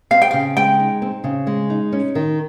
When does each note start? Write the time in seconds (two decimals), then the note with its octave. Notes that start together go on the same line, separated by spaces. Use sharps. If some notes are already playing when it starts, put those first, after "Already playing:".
0.11 C4 F5
0.22 G5
0.31 C#3 F5
0.57 G#3 G5
0.80 D#4
1.02 C4
1.24 C#3
1.47 G#3
1.70 D#4
1.92 C#4
2.15 D#3